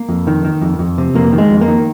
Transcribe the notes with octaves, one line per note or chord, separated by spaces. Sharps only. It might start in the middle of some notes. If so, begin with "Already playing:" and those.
Already playing: A#3
F2
D#3
D#3
F2
F2
C3
F2 A#3
D#3
G#3
F2
A#3
D#3